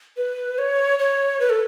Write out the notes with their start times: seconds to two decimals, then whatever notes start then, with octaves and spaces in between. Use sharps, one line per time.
0.17 B4
0.58 C#5
0.99 C#5
1.40 B4
1.50 A4